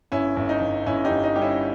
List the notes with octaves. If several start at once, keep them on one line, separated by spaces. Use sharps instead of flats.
G1 C#4 E4
G1
D#4
G1
G1 C#4 E4
D#4 G4
G1
D#4
G3 G4
C#4 E4